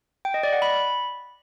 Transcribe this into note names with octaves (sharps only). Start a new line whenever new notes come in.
G5
D#5
D5
F#5
B5